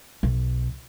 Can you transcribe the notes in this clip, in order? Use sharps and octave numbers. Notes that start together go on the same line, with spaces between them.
B1